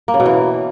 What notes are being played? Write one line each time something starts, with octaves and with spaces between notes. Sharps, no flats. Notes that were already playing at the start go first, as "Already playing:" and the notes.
A#3
C#3
B2
E3